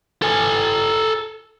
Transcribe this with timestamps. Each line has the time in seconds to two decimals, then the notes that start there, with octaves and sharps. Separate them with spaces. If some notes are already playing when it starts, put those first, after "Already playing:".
0.22 A4 G#5